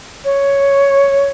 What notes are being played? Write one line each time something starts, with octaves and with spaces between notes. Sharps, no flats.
C#5